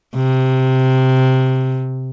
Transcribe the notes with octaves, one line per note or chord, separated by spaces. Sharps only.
C3